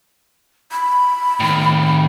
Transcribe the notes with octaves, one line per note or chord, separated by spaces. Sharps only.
B5
A2 D#3